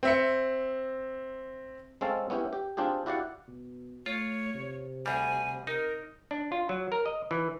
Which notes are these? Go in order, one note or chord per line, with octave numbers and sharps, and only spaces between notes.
C4 E5 C#7
G#3 C4 C#4 A4 F5
B3 C#4 E4 G4
G4
C4 D4 F4 G4 G#4
E4 F#4 G4 D5 F5 F#5
B2
A3 F4 C#5
C3
D2 G3 G#5
D#4 A#4
D4
F4
F#3
A#4
D#5
E3